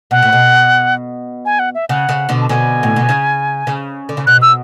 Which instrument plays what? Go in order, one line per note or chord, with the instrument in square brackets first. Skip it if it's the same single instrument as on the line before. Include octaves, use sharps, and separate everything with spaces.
[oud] B2 [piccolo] F#5
[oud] A2
B2
[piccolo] G#5
F#5
E5
[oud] C#3 [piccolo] F#5
[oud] C#3
B2 D3
[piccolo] A5
[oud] B2 D3 [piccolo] G#5
[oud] A2
B2
C#3
C#3
D3
C#3
[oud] B2 [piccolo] F#6
[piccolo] E6